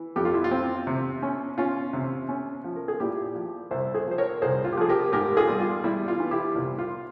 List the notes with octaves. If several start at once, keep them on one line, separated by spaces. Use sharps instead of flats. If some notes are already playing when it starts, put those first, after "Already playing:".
Already playing: E3
F2 G4
F4
E4
F4
C4
C3
C#4
C#4 F4
C3
C#4
F3
A#4
G#4
A#2 E4 G4
F3
C2 C5 E5
G#4 C5
F3 C5
A#4 C#5
C2 G#4 C5
F4
G4
F3 G#4
G4 A#4
G#2 G4 A#4
F4 G#4
G3
F4
G3 E4
F4
E3
E4 G4
C2 F4
F4